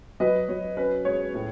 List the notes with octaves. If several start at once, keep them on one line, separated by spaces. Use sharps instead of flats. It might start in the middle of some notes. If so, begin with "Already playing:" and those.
F#3 B4 D#5
F#3 C#5
C#4 B4
G#3 C#5
A2